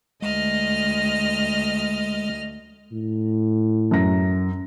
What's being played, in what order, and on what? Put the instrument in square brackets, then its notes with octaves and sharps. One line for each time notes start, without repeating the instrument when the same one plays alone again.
[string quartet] D2 D#5 F6 [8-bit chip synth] G#3
[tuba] A2
[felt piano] F#2 A#6